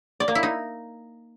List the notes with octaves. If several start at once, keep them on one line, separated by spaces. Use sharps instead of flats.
D5
A#3
E4
D#4